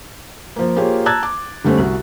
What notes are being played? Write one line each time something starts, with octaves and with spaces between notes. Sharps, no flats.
F3 A#3
A#3 F4 G4 G#4 C5 C#5
A5 A#5 E6 F#6 G#6 A6
D6
D3 G3 A3 C4 C#4
C2 F#4